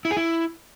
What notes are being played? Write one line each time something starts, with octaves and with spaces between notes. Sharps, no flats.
E4
G#4
E4